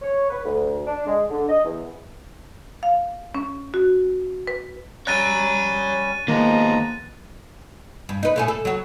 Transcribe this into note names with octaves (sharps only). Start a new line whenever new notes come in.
C#5
B4
D2
D4
G#3
D3
D#5
E2
F5
C#4
F#4
B4
G3 C#4 C#5 A#5 F#6 A6 D#7
D#3 F3 G#3 A#3 B3 A#5
G2
D#4 B4
A2 A3 G#4
A4
F#3 F#4